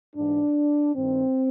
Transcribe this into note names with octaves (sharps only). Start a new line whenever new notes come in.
G#2 E3 D4
G2 D#3 C4